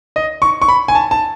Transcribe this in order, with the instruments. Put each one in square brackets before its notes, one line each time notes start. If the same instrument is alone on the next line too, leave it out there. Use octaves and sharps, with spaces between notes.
[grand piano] D#5
C#6
C#6
B5
G#5
A5
A5